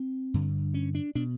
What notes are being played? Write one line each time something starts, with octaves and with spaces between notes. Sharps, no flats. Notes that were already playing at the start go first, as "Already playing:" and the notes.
Already playing: C4
G2 D3
C#4
D4
B2 D4